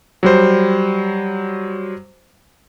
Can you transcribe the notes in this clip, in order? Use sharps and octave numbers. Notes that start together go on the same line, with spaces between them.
F#3 G3 C5